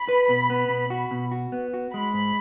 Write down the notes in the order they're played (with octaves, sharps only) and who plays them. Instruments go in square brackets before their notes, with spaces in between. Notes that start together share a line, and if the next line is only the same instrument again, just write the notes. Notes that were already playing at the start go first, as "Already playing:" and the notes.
Already playing: [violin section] B5
[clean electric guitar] B4
B2
B3
B2
F#4
B2
F#4
B3
F#4
[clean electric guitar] G#3 [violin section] B5
[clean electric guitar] G#2